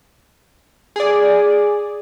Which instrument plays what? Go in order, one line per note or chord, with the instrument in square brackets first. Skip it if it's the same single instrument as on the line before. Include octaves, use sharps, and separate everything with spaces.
[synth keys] G#4 D5